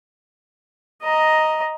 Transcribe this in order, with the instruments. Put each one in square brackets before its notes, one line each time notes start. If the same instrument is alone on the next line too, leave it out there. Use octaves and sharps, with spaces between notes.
[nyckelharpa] D#5 A#5